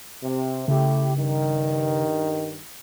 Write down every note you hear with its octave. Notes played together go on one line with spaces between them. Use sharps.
C3
C#3 A3 E4 G4
G2 D#3